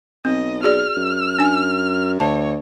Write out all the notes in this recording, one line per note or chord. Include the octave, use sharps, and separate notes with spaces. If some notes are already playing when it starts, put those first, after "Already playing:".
B1 C4 D#5
F#4 G#4 D5 F6
F#2
D4 G#5
D2 C#5 A5